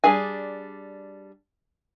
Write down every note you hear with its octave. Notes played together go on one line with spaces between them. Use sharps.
G3 D4 G#4 G#5